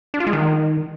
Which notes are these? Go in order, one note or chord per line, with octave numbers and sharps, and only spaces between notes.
D4
F4
G#3
D#3